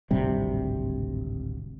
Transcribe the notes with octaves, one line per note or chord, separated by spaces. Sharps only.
D1 G#1 C3 G3